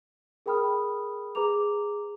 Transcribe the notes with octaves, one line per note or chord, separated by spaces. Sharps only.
G#4 A#4 G5 B5 D#6 F6
G#4 B4 A#5 D6 F7